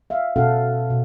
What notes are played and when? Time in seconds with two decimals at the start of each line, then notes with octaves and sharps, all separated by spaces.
0.10 E5 F5
0.36 B2 C#4 F#4 A4 F5 F#5
0.90 B2